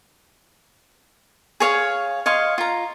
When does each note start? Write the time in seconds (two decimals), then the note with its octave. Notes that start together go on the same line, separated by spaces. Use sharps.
1.60 G#4 C#5 F5
2.26 C#5 D#5 F5 C6
2.58 F4 A#5